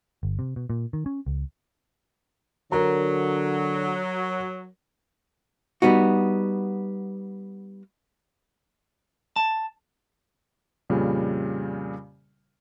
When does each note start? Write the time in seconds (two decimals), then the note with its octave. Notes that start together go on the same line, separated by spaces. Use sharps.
0.23 G1
0.39 C3
0.56 B2
0.70 A#2
0.93 D#3
1.06 C#4
1.26 C#2
2.72 D3 F#3 A#4 A#5
5.82 G3 B3 D#4 F#4
9.36 A5
10.90 F2 A#2 C#3 G3